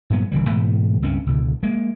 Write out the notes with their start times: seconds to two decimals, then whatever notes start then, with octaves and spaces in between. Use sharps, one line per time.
0.10 G2 A#2 F#3 B3
0.32 D#1 D3 E3 G3
0.49 G#2 B2 E3 A3
1.02 C#2 G2 C4 C#4
1.26 C#2 B2 D3
1.63 G#3 A#3